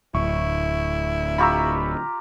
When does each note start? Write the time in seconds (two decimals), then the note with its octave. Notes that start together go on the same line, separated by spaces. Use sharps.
0.15 D1 E4 C#6
1.38 F4 G4 A#5 B5 C#6 E6